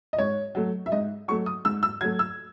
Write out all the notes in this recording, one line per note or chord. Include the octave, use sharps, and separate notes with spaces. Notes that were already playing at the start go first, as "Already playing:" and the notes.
D#5
G#2 C#5
F#3 A3
E5
G#2 D#5
F#3 A3 C#6
D#6
G#2 E6
E6
F#3 A3 G#6
E6